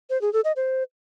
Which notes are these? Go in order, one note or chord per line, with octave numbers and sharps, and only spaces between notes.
C5
G#4
A4
D#5
C5